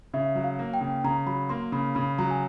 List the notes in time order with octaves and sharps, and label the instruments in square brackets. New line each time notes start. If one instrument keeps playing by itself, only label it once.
[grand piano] C#3 [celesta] E5
[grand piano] F#3
[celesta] F5
[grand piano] A#3
[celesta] G5
[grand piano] C#3
[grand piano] C#3 [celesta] A#5
[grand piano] F#3 [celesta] B5
[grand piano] A#3 [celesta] C6
[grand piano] C#3 [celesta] B5
[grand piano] C#3 [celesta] B5
[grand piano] F#3 [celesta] A#5
[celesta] G#5